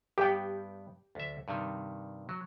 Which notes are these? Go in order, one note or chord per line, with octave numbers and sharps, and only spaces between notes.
G2 B3 G4 G5
D2 E5
G2 C3 D#3
F#3